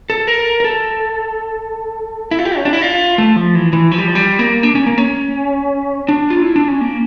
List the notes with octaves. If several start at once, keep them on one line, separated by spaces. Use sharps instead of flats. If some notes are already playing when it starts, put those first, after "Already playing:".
A4
A#4
A#4
A4
E4
F4
G4
C#4
D4
E4
F4
A3
F3
E3
E3
F3
G3
F3
G3
A#3
D4
C#4
A#3
C#4
D4
F4
E4
D4
C#4
A#3